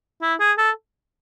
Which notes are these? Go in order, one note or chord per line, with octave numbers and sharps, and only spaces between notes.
E4
G#4
A4